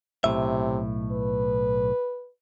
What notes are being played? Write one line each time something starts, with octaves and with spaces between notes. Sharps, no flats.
B1 A2 C3 E5
B4